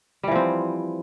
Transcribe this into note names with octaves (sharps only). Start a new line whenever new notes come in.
E3 F3 G3 C4